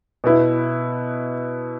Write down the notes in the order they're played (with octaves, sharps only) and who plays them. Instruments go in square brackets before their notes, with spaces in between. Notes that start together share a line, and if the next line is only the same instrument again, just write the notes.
[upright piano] B2 B3 E4